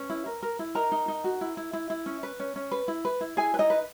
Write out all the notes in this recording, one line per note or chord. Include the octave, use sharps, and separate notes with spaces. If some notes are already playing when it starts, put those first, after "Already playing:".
Already playing: C#4 B4
E4
A#4
A#4
E4
D#4 A#4 A#5
D#4
D#4
F#4
E4
E4
E4
E4
C#4
B4
C#4
C#4
B4
E4
B4
E4
E4 G#4 G#5
B4
D#4 D#5
B4